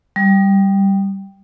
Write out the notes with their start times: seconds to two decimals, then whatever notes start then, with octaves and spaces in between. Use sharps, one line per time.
0.16 G3